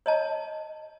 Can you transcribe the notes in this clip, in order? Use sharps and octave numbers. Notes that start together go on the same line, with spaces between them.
C#5 D#5 A5